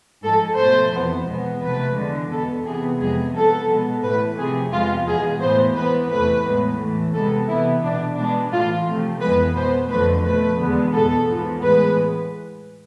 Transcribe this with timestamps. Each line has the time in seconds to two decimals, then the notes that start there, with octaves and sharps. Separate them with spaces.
0.23 G#2 F3 G#3 A4
0.58 B2 A3 C5
0.93 F2 C3 E3 B3
1.27 E2 B2 G#3 B3
1.62 C3 F3 A3 B4
1.96 E2 D3 G#3
2.31 E2 B2 B3 A4
2.65 C3 E3 B3 G#4
2.99 F2 C3 G#3 B3 G#4
3.34 G#2 F3 B3 A4
3.69 B2 G#3 B3
4.03 A2 E3 A3 B4
4.38 C3 F3 A3 G#4
4.72 F2 C3 G#3 B3 F4
5.07 E2 B2 G#3 G#4
5.41 A2 E3 B3 C5
5.76 G#2 E3 B3 B4
6.10 E2 C3 E3 A3 B4
6.44 A2 G#3 B3
6.79 A2 E3 A3
7.14 C3 G#3 B3 A4
7.49 C3 E3 B3 E4
7.83 B2 B3 D4
8.17 B2 G#3 B3 D4
8.51 A2 E3 A3 F4
8.86 C3 F3 A3
9.20 F2 E3 G#3 B3 B4
9.55 B2 B3 C5
9.90 F2 D3 F3 A3 B4
10.25 B2 A3 B4
10.59 E2 D3 G#3 B3
10.93 E2 B2 G#3 B3 A4
11.28 G#2 F3 B3
11.62 A2 E3 G#3 B3 B4